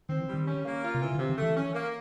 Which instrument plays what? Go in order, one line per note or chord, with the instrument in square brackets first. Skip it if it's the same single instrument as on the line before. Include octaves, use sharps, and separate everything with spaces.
[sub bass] D#3 [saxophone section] C4
[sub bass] E3
[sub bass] D#3 [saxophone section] G3
[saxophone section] C#4
A#3
F4
[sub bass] C3
[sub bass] C#3 [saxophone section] E3
[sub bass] D3
[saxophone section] C3
[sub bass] D#3
[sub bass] E3 [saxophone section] A3
[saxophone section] C#4
A#3